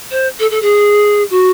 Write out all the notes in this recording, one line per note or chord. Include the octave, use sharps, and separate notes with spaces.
C5
A4
A4
G#4
F#4